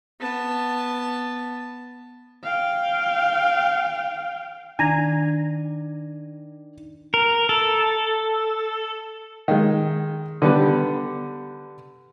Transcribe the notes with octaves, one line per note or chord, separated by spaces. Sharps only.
B3 A5
F5 G5
D#3 D4 G#5 A#5
A#4
A4
D#3 G#3
D3 G3 B3 B4